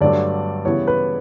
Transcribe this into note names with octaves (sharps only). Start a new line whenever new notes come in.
G2 D3 F#3 A3 D4 D5
C#3 E3 G3 B3 E4 C#5
B4